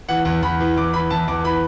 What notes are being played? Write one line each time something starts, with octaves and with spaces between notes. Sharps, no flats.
E3 F#5
E2
E2 B5
E3
E2 D6
E3 B5
E2 A5
E2 D6
E3 B5